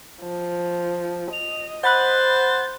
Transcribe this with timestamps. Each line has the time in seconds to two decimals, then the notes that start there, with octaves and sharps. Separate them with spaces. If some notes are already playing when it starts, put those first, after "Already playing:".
0.22 F3
1.33 D#5 F7
1.84 C5 F#5 B5 F#6 A6